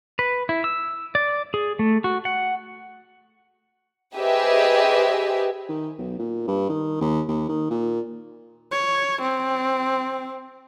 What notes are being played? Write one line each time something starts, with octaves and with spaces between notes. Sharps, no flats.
B4
E4
E6
D5
G#4
A3
F#4
F#5
G4 G#4 B4 C5 D#5 E5
D#3
B1
A#2
G2
D#3
D#2
D#2
D#3
A#2
C#5
C4